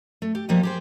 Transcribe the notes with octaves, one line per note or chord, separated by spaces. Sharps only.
A3
G4
F3 G3 A#3 C4 G4 D#5
G4 G#4 C5